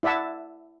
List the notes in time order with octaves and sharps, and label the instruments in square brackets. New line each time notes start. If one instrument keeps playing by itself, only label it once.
[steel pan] E4 D5 E5 F#5 A5